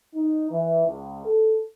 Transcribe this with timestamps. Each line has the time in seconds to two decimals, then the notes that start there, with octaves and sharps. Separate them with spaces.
0.14 D#4
0.50 E3
0.85 C#2
1.24 A4